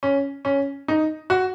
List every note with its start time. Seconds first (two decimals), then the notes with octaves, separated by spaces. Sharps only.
0.03 C#4
0.45 C#4
0.88 D#4
1.30 F#4